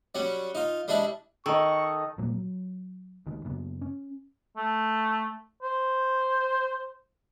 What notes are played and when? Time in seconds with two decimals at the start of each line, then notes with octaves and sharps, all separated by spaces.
0.15 F#3 G3 C#4
0.55 D#4 F4
0.88 G3 G#3 D4 E4
1.46 D#3 A4 D#5 C#6
2.18 A#2 F#3 G3 A#3
2.32 F#3
3.26 C#2 D#3
3.45 F#2 C#3 B3
3.81 C#4
4.57 A3
5.63 C5